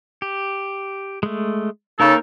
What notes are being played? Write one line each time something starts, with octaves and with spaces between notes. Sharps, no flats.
G4
G#3 A3
C#3 A#3 D#4 A4 A#4